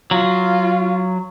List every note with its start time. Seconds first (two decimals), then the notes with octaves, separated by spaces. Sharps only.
0.11 F#3 F4